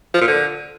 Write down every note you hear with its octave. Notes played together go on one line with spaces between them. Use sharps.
F3
A#2
D3